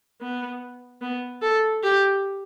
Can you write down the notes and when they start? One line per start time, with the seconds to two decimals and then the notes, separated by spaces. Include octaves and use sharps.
0.21 B3
1.01 B3
1.42 A4
1.83 G4